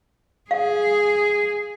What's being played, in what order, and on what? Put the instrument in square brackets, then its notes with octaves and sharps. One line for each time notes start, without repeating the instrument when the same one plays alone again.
[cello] G#4 [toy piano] F5